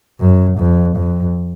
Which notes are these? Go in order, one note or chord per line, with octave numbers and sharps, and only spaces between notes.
F#2
F2
F2